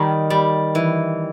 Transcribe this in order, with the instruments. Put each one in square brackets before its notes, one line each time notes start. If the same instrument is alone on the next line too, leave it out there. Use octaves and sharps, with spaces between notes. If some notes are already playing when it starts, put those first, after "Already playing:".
Already playing: [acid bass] D#3 [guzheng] G3
[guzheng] G3
E3